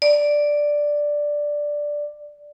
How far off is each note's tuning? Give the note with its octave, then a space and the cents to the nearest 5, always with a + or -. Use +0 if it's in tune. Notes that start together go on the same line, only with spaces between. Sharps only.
D5 +0